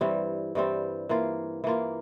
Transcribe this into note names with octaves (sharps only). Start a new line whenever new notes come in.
G2 E3 G3 C4
G2 E3 G3 C4
E3 A#3 F4
E3 A#3 F4